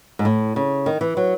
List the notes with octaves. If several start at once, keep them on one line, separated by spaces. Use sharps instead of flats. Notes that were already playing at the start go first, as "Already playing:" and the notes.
G#2
A2
C#3
D#3
E3
F#3